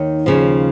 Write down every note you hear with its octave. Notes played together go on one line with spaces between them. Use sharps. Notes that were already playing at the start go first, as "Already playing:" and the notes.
Already playing: D#2 D#3 C#5
D#2 C#3 F3